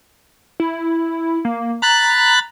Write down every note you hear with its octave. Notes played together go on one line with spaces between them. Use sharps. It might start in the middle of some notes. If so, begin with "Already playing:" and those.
E4
A#3
A#5 B5 F#6 A6